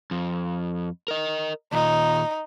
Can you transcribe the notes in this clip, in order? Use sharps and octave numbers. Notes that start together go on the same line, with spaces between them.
F2
A#4 D#5
D#2 A#2 D#4